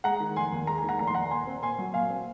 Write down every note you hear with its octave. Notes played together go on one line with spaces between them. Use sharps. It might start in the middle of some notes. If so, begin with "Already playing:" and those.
G#3 F#5 A#5
D#3
F1 G#5 C6
D#2
G#3 A#5
G#5
D#3
F#5 A#5
F1 A#5
C6
D#2 F#5 A#5
A#2 G#5 C6
C4
A#2 G#5 C6
F#3
A#2 F5 G#5
C4